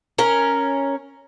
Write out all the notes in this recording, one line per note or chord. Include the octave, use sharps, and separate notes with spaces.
C#4 A#4